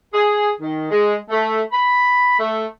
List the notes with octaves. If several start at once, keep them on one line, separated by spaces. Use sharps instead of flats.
G#4
D#3
G#3
A3
B5
A3